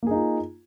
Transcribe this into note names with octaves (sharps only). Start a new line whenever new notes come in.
A#3 D#4 F4 G#4